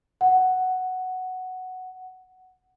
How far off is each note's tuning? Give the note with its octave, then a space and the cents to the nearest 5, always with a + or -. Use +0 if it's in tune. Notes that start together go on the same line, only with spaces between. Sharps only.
F#5 +5